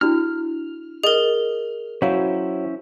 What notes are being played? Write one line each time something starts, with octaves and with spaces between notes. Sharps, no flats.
D4 E4 F#4 F6
G#4 A#4 D#5
F#3 C#4 E4 C5 C#5 F5